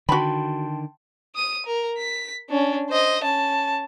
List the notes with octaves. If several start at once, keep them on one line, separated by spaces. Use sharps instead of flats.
D3 D#3 F#4 G5 A5 B5 C6
D#6 D#7
A#4
B6
C#4 D4
C5 D#5
C#4 A5